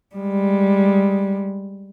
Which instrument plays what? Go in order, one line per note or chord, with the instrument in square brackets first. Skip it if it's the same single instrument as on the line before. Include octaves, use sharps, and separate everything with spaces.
[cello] G3 G#3